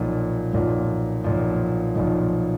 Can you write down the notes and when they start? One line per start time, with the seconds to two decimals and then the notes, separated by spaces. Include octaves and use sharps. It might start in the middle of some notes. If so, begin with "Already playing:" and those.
Already playing: B1 A#2 F3
0.54 B1 A#2 F3
1.24 B1 A#2 F3
1.95 B1 A#2 F3